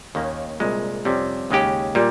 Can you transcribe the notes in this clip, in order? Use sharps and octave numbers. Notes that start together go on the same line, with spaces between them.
D#2 D#3 A#3 C#4
C2 A#2 G#3
F2 C3 G3 C#4
D#2 C#3 G#3 C#4 G4
A#2 G3